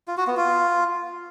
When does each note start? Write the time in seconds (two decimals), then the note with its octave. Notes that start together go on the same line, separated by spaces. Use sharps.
0.08 F4
0.17 F#4
0.27 B3
0.37 F4